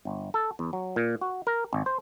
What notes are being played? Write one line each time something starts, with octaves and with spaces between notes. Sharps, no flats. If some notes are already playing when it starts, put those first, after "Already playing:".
G1
A4
E2
F#3
A#2
F#4
A#4
G#1
C5